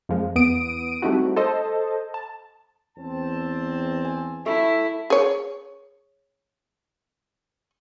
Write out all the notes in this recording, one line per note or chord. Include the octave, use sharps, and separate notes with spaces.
F2 F3 G#3
E2 B3 D#6 D7 D#7
G3 A3 C4 D#4 E4 F#4
A4 C5 D#5 A5
A5
E2 C4 A5
G#5
A3 E4
G#4 C#5